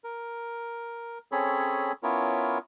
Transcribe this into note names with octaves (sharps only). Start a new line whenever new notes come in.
A#4
C4 C#4 G#4 A4 C#5 B5
B3 C#4 E4 F4 A#4 C#5